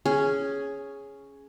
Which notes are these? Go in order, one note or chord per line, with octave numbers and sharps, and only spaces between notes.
C#4 G#4